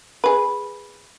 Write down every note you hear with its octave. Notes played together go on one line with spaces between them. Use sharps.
G#4 B4